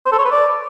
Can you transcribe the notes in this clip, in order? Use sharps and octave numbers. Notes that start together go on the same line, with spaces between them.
C5
A4
C#5
B4
D5